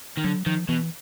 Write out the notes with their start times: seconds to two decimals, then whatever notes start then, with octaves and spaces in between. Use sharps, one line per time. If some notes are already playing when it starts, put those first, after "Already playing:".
0.18 D#3
0.24 D3 F#3
0.46 D#3 F3
0.69 B2 E3